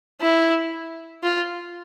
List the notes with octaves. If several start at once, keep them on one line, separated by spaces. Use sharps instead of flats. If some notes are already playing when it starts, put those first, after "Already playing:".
E4
F4